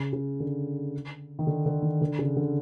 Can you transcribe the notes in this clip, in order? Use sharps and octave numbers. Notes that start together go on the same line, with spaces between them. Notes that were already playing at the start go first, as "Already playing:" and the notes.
Already playing: C#3
C#3
D3
D#3
D3
D3
D#3
D3
C#3
D3